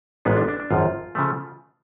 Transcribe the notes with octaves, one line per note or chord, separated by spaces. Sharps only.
A1 G#2 G#3 B3 F4
D4
D4
D4
G#1 F#2 F3 F4
C#3 F3 A3